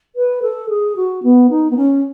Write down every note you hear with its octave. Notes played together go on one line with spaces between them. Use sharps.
B4
A4
G#4
F#4
B3
D#4
B3
C#4